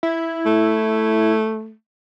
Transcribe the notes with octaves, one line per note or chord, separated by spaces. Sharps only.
E4
A3